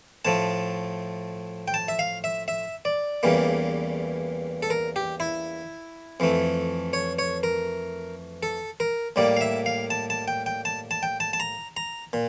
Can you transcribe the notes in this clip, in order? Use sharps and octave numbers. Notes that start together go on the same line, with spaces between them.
A2 F3 A3 A5
G5
A5
E5
F5
E5
E5
D5
E2 C#3 E3 G3 A#3
A4
A#4
G4
E4
F2 E3 A3
C#5
C#5
A#4
A4
A#4
A2 G3 A#3 D5
F5
E5
F5
A5
A5
G5
G5
A5
A5
G5
A5
A5
A#5
A#5
A#2